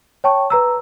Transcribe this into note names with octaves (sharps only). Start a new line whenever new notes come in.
C#5 G5 A5 C#6
B4 A#5 E6